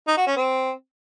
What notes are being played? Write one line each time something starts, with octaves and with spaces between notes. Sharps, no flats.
D#4
F#4
C#4
C4